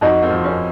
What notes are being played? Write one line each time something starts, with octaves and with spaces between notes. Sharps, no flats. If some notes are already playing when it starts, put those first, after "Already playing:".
F2 D#4 F#4
C4
F3
C#4